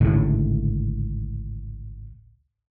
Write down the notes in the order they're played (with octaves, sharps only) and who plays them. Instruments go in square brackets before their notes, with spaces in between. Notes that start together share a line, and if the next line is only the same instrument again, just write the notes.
[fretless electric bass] G#1 C#2 A2 D3